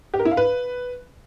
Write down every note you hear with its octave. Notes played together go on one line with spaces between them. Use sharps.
G4
A#4
E4
F5
B4